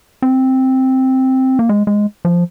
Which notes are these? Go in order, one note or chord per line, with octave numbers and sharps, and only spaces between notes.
C4
A#3
G#3
G#3
F3